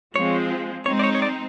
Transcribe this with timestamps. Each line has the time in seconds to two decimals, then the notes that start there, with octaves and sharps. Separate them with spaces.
0.15 F3 G#3 C4 C#5
0.86 G#3 C4 D#4 C#5
0.99 D5
1.04 C#5
1.15 C#5
1.22 D5